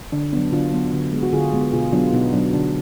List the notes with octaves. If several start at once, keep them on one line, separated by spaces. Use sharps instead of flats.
D3 D4
F#3 B3 D4
D3 D4 F4
F#3 B3
D3
G#3 B3
F#4
D3 F4 G#4
G#3 B3
B2 F4 G#4
F#3 B3 D4 F4
B2 B3 D#4
F#3 B3 D4
D3 D4